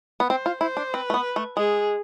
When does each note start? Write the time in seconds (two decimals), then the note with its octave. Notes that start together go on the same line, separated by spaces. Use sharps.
0.20 B3
0.29 C4 C5
0.46 F4
0.61 E4 C5
0.77 D4
0.94 C4 B4
1.10 A3
1.14 B3
1.36 A3
1.57 G#3 G#4